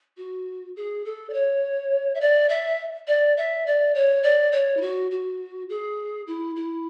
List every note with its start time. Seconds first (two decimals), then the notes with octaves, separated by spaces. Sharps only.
0.17 F#4
0.76 G#4
1.05 A4
1.30 D5
1.33 C#5
2.15 E5
2.21 D5
2.49 E5
3.07 D5
3.37 E5
3.66 D5
3.95 C#5
4.23 D5
4.52 C#5
4.77 E4
4.81 F#4
5.11 F#4
5.69 G#4
6.27 E4
6.56 E4